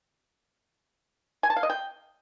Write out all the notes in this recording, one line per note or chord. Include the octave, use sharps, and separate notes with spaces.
G#5
A5
F5
D#5
G5